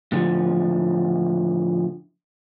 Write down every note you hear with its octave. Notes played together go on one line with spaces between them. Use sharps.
A2 D3 E3 F3